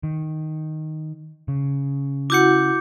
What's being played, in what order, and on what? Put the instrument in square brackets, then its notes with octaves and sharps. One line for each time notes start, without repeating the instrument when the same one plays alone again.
[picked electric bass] D#3
C#3
[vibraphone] E4 F#4 F#5 [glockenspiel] D6 G6 C#7